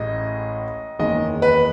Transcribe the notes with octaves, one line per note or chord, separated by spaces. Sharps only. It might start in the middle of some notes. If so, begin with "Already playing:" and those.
Already playing: A1 A2 G#3 D#5
F#1 E2 D#3 G#3 D#5
B4